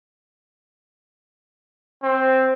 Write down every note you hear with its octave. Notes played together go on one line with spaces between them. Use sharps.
C4